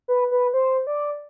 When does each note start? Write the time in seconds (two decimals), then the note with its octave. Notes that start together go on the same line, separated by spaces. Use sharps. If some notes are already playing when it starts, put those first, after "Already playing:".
0.08 B4
0.31 B4
0.54 C5
0.87 D5